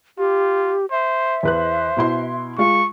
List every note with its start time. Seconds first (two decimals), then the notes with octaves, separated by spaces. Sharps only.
0.18 F4 G4
0.91 C5 E5
1.43 E2 B4 C5 F#6
1.97 B2 E4 C6
2.58 G#3 F4 C#6